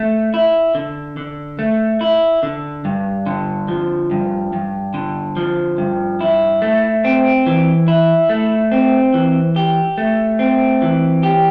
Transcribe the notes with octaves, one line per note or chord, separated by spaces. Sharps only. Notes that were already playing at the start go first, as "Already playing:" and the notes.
Already playing: A3
E4
D3
D3
A3
E4
D3
G2
D3
F3
G2
G2
D3
F3
G2
E4
A3
C4
E3
E4
A3
C4
E3
G4
A3
C4
E3
G4